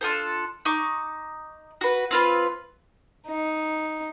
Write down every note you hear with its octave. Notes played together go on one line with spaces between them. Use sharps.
D4 F4 A4 C5
D#4 C#6 D6
F#4 B4
C4 F4 B4
D#4